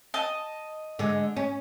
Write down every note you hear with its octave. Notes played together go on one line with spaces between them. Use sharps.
D#5 A5
D3 G#3
C#4